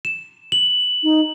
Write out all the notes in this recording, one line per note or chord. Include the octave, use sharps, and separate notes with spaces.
E7
F#7
D#4